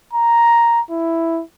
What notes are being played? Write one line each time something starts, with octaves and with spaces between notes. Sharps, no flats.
A#5
E4